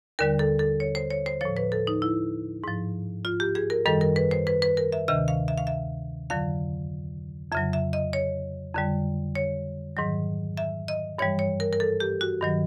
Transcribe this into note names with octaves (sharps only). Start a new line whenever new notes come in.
D#2 D3 G3 A#4
A4
A4
C#5
C5
C#5
C5
A2 F3 C#5
B4
A4
D#4
E4
G#2 F3
F4
G4
G#4
A#4
F#2 D#3 G3 A4
A#4
B4
C5
B4
B4
A#4
E5
D2 C3 D#3 E5
F5
E5
F5
E5
F2 D3 F#3 F5
F2 C#3 F#3 E5
E5
D#5
C#5
F2 D3 G3
C#5
G#2 D#3 F#3
E5
D#5
G2 E3 G3 C#5
C#5
A#4
A#4
A4
G4
F#4
G2 D#3 F#3